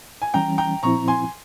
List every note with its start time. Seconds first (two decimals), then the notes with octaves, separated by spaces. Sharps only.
0.22 G#5
0.34 E3 G3 C#4 G5 A#5
0.58 G5 A#5
0.83 A#2 F3 C4 E4 A#5 C#6
1.08 G#5 C6